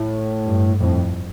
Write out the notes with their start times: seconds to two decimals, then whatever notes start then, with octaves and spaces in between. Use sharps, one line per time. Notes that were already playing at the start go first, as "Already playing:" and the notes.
Already playing: A2
0.45 G2
0.80 F2 A2